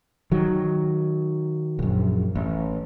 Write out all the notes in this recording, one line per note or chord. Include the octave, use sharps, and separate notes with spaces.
D#3 F#3
A#1 F#2
A1